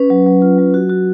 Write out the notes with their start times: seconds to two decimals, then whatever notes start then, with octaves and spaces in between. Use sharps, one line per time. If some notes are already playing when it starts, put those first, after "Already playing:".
Already playing: C#4 B4
0.10 F#3
0.26 F#3
0.42 F4
0.58 F#3
0.74 F#4
0.89 F#4